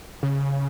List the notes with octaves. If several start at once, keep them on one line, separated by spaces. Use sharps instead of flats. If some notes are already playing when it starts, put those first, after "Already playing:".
C#3